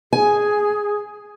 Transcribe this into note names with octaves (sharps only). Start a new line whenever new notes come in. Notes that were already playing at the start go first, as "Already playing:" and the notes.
G#4 G#5